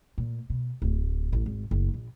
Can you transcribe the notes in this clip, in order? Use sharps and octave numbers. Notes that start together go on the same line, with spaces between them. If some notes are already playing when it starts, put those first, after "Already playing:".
A#2
B2
D1
A1
G#1
F#1
A#1